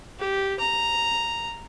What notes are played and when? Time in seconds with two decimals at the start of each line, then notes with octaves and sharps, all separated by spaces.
0.20 G4
0.60 A#5